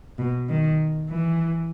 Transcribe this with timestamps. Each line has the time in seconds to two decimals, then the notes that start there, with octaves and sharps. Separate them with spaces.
0.19 B2
0.49 D#3
1.10 E3